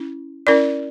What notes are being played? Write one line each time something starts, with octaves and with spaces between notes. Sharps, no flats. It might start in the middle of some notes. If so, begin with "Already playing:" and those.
Already playing: C#4 E4
C#4 E4 A#4 D5